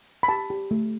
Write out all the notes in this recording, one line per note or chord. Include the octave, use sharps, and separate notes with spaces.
B5
G4 A5
G4
A3